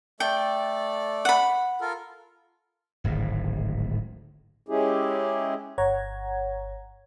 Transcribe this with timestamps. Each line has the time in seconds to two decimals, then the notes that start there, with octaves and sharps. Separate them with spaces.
0.20 A3 A4 D5 G5
1.25 F#5 B5
1.81 F4 A4 A#4
3.04 D1 G#1 A2
4.69 G#3 C#4 E4 G4 G#4
5.78 G1 C#5 F#5 A#5 G#6